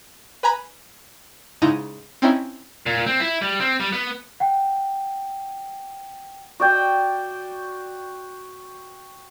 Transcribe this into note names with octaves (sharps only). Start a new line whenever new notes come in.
B4 G#5 A#5 B5
G#2 C#3 D#4 E4 A#5
C4 C#4 D#4 E4
A#2
C4
E4
G3
C4
G3
B3
F#5 G5
F#4 D5 G5